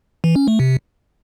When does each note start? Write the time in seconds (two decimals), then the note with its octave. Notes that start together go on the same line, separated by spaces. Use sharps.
0.24 E3
0.36 C#4
0.48 A3
0.60 C3